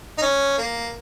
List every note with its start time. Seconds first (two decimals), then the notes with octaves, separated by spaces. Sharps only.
0.18 D#4
0.22 C#4
0.58 A#3